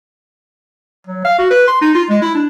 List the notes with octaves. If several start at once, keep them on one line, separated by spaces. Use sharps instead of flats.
F#3
F5
F#4
B4
C6
D#4
F4
G#3
E4
D4